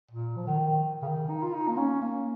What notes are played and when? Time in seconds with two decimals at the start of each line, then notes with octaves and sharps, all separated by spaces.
0.11 A#2
0.36 F3
0.47 D#3
1.02 C#3
1.07 D#3
1.30 D#4
1.42 F4
1.54 D#4
1.68 A#3
1.77 C#4
2.01 A#3